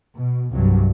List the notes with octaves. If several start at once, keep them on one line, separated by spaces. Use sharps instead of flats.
B2
C2 G2 F#3